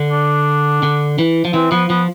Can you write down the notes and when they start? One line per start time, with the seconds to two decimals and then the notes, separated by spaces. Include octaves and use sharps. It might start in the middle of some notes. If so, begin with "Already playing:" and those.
Already playing: D3
0.11 D4
0.83 D3
1.19 E3
1.45 F3
1.54 E3 C4
1.71 F3 B3
1.90 F3 B3